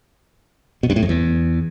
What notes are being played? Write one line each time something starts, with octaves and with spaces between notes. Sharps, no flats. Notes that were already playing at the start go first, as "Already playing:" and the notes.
B2
G2
A2
F2
E2